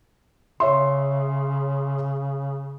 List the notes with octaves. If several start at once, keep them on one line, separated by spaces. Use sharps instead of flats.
C#3 C#5 E5 C6